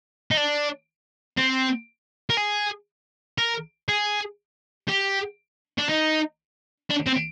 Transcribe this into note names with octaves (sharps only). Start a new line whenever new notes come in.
D#4
D4
C4
A#4
G#4
A#4
G#4
G4
D4
D#4
D4
C4